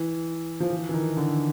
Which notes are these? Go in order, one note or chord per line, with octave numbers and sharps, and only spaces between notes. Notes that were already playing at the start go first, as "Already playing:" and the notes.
Already playing: E3
F3
E3
E3
D#3
D3